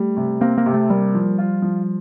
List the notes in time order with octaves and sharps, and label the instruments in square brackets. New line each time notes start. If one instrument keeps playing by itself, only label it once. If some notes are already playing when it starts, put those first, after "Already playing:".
Already playing: [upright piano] G3 [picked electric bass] A3
[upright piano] C3
[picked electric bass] A#3 [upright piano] C4
[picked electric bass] A#3
[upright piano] C3
[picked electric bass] A3
[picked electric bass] G3 [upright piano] A#3
[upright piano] F3
F4
F3